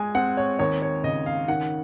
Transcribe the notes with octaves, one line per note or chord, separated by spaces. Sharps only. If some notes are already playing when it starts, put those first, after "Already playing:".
Already playing: G#3 G#5
C4 F#5
C#5
D#2 C#5
C#5
C#3 D#5
F5
D#3 F#5